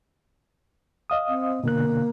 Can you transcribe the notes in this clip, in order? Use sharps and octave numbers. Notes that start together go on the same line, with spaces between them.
D#5 F5 D#6
C4
B2 D3 A#3 F#6